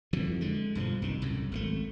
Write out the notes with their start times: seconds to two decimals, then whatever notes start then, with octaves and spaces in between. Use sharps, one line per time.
0.13 F2 D3 E3 F#3
0.41 D3 G#3
0.75 B1 G2 E3 F3
1.02 C2 D#3
1.22 C2 F#2 A2
1.52 G#1 D3 A3